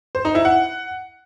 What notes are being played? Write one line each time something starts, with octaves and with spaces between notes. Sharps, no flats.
C5
D#4
E4
F#5